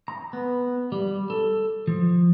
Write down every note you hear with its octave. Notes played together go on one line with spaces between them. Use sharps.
A#5
B3
G3
A4
F3